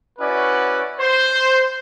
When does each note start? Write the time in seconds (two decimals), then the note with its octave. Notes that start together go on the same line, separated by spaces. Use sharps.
0.19 C#4 E4 F#4 B4 D5
0.99 C5